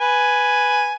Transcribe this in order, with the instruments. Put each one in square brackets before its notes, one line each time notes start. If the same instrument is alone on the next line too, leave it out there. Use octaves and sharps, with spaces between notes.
[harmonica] B4 G#5